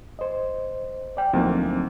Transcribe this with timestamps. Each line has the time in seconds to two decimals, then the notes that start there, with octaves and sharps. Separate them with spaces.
0.19 C5 D#5
1.17 D5 G5
1.33 D2 F3 F#3 A#3 C4 D#4